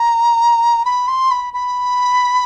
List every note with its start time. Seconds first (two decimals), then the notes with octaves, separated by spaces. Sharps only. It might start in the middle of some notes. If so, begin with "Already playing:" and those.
Already playing: A#5
0.85 B5
1.08 C6
1.31 B5
1.54 B5